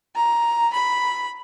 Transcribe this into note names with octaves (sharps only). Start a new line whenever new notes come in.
A#5
B5